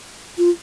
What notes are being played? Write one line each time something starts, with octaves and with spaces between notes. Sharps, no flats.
F4